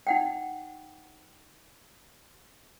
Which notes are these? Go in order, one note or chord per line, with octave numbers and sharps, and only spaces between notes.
D#4 F#5 G5